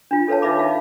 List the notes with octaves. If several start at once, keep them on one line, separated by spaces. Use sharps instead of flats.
D4 F4
A4 B4 C#5 F5 A5
D#4 B4 E5 A5 B5 D6
F5